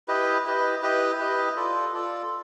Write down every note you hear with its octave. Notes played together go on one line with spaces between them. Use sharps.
E4 G4 B4 D#5
E4 G4 B4 D#5
E4 G4 B4 D#5
E4 G4 B4 D#5
F4 A4 D5
F4 A4 D5